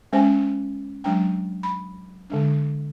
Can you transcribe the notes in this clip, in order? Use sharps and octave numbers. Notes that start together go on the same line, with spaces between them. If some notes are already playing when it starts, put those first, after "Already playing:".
G#3 C#4 C5 G5 G#5
F#3 G#3 D4 G5
B5
D3 G#3 D4